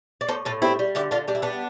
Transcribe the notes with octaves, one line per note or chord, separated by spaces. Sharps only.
D5
A2 A4 C5
A2 F4 A4
G3 C4 E4
G3
D3 E4 G4
D3 D4 F4
G3 D4
E4
G3 B3 D4